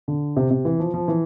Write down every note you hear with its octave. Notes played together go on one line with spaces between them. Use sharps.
D3
C3
C3
E3
F3
F3
E3